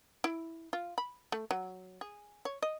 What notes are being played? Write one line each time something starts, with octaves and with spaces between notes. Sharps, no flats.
E4
F4
B5
A3
F#3
G#4
C#5
D#5